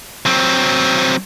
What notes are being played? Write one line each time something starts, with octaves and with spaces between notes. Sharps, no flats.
F#3 C4